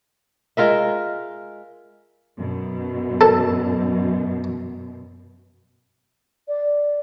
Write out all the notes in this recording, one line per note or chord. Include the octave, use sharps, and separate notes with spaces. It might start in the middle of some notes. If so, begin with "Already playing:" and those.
G#3 F4 A#4 E5
F#2 B2
A4
D5